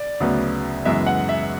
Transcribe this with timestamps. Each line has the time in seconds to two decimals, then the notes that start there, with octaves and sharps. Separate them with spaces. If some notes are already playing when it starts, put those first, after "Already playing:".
Already playing: D5
0.20 D2 C#3 F#3 B3
0.85 F#2 C#3 E3 G#3 B3 E5
1.06 F#5
1.29 E5